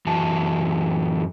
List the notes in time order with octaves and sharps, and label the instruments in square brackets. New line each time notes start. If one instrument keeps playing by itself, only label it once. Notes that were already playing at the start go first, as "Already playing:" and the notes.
[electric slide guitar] F#2 E3 F#4 A5